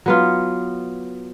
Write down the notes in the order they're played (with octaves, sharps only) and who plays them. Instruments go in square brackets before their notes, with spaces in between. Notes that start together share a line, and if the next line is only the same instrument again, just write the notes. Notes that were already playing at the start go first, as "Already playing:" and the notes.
[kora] F#3 B3 F4